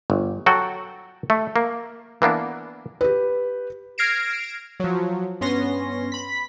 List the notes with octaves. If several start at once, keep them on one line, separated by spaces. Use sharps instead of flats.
G1
F#3 F#4 A4 G5
A3
A#3
E3 A#3 B3 D4
G4 B4
F6 G#6 A#6 C7 D7 E7
F3 F#3
G2 B3 C#4 C6 A#6
B5 B6